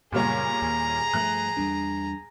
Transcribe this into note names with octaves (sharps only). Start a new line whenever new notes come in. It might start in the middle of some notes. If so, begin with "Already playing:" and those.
F#2 A#2 C#3 G3 B3 G#4 C#5 A#5
D#2
G2 F3 A3 F#6
E2 G3 D4